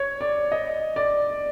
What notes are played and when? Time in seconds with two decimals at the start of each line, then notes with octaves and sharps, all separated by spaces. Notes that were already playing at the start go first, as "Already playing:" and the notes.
Already playing: C#5
0.21 D5
0.52 D#5
0.96 D5